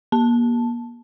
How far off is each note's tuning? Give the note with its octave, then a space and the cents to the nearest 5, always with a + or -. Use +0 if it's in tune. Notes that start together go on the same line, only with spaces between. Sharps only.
A#3 +35 A5 +0